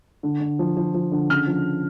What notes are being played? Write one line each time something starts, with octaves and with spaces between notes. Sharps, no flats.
D3
D3
F3
F3
F3
D3
C#3 F6
F3